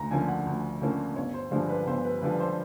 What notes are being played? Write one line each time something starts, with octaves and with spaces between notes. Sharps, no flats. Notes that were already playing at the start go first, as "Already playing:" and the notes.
Already playing: D2 A#5
D3 F3 A#3 C#4 G#5
F#5
D2
D3 F3 A#3 C#4
G1 C#5
C5
G2 D3 F3 G#3 C5
B4
G1 C5
B4
G2 D3 F3 G#3 B4
C5